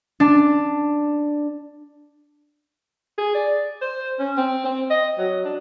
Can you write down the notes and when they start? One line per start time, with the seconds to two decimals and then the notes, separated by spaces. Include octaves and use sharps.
0.20 D4
3.18 G#4
3.35 D5
3.82 C5
4.19 C#4
4.37 C4
4.65 C4
4.90 D#5
5.18 F#3
5.45 D4